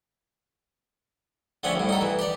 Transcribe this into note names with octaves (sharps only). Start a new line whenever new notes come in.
D3 F3 A3 C4 C#4
C2 A2
D#4 A4
E3
G4 D5